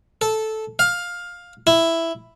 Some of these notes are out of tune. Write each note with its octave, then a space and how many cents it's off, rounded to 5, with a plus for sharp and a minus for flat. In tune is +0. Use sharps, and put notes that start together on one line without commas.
A4 -10
F5 +15
E4 +5